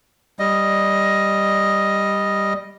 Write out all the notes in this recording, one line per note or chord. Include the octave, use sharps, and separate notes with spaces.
G3 D#5